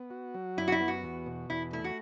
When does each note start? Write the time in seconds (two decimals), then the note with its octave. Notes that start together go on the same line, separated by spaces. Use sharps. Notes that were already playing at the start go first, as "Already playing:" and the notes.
Already playing: B3
0.10 F#4
0.34 F#3
0.57 F#2 E4
0.68 F#4
0.72 E4
0.80 B3
0.88 F#4
1.03 E2
1.26 B2
1.50 E2 E4
1.73 A3 E4
1.84 F#4